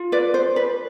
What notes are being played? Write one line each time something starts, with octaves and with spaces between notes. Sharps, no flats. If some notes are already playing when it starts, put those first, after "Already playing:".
Already playing: F4
B4 D5
C5
B4